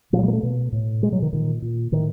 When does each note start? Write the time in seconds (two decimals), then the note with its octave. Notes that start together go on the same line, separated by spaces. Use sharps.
0.13 A#2 F3
0.19 F#3
0.23 G3
0.28 A#3
0.33 A3
0.43 B2
0.72 A2
1.02 B2 G#3
1.13 F#3
1.22 D#3
1.33 A#2 D#3
1.62 A#2
1.92 A2 D#3